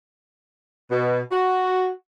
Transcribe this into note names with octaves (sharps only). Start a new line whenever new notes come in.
B2
F#4